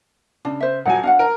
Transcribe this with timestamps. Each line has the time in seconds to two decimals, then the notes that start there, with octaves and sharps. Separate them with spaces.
0.45 C#3 D4
0.60 C5 E5
0.85 D#1 F#3 F#5 G#5
1.03 D4 F#4 F5 F#5
1.19 A#4